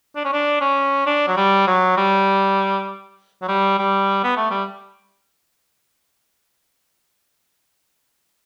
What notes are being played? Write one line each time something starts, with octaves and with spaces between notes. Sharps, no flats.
D4
C#4
D4
C#4
D4
F#3
G3
F#3
G3
F#3
G3
G3
B3
A3
G3